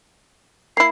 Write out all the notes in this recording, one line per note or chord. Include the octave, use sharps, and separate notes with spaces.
A#3 E4 C7